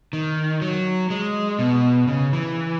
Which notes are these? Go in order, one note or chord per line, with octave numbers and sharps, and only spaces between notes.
D#3
F#3
G#3
B2
C#3
E3